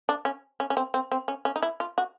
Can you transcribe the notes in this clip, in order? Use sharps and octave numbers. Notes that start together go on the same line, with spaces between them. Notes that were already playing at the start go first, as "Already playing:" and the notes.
D4
C#4
C#4
C#4
C4
C4
C4
C#4
C#4
D#4
E4
F4
F#4